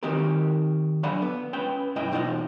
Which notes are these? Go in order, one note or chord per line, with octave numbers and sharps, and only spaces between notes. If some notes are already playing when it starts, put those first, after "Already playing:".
D#3 C4 D#4 F#4 G4 A#4
D3 F#3 D5 F5 F#5 B5
B3
C#4 B4 G5
B1 G2 E4 D#5 G5
E2 B2 D#4 F4 D#5 F#5